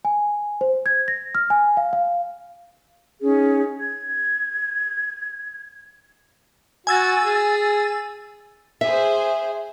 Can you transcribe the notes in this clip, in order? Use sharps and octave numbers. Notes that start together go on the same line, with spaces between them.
G#5
C5
G#6
A#6
F6
G#5
F5
F5
C#4 D#4 G#4
G#6
F#4 G#5 E6 A6
G#4
G#4 C5 E5